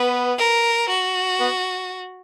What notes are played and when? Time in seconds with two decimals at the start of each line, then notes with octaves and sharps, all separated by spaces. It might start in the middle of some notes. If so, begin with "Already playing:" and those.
Already playing: B3 B4
0.38 A#4
0.89 F#4
1.40 B3